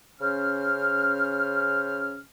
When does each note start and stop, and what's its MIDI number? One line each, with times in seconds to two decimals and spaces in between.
0.20 2.18 49
0.20 2.18 61
0.20 2.18 72
0.20 2.18 89